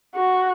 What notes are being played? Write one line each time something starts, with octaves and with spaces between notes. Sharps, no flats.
F#4